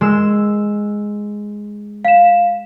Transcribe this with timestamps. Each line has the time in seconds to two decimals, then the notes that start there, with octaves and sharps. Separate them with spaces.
0.01 G#3 E6
2.05 F5 E7